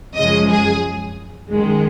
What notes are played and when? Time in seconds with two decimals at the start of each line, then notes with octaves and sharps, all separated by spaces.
0.15 F#2 C#3 F3 G#3 D#5
0.50 G#4
1.51 F#2 D#3 G#3